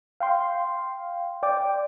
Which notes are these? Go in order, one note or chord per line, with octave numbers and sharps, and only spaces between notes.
F5 G5 C6
D5 G5 D6